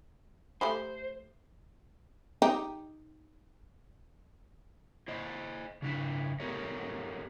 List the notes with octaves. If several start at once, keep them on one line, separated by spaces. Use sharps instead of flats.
A3 G4 C5 B5
D#4 G4
E4 C5 D#5
C#3 D4 E4
B3 E4 G4 A4 A#4 C#5